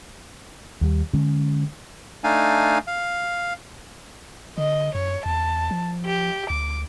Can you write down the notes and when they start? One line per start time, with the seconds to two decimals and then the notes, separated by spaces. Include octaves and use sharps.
0.81 D#2 G3
1.13 D3 G#3 C#4
2.24 A3 D4 D#4 F5 G#5
2.87 F5
4.58 D3 D#5
4.95 F#2 C#5
5.26 E2 A5
5.71 F3
6.06 G4
6.50 D2 D6